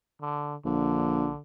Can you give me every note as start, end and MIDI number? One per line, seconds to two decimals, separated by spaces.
0.21 0.56 50
0.65 1.28 34
0.65 1.40 50